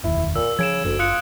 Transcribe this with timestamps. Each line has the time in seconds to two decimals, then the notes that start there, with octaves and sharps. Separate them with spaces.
0.04 F1 D#2 E4
0.35 A#2 E6
0.59 C#3 F3 G#6 D7 E7
0.85 F#1 D2
0.99 F4 D#6 F#6 C#7